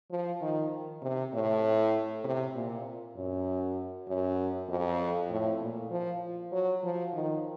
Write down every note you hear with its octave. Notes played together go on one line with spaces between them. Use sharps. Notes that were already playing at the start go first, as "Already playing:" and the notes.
F3
D#3
C3
A2
C3
A#2
F#2
F#2
F2
A2
A#2
F3
F#3
F3
D#3